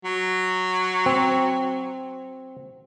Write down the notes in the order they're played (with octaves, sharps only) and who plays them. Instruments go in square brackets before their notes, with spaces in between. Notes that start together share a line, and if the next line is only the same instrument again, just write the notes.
[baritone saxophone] F#3
[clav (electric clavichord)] C4